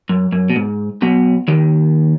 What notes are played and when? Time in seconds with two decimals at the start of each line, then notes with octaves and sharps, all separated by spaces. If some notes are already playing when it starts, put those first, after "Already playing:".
0.09 F#2
0.32 F#2
0.50 B2
0.56 G#2
1.02 B1 B2
1.48 D#2 D#3